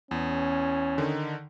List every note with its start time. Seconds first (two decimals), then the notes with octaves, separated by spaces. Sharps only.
0.11 E2 C#4
0.98 D3 D#3 D#4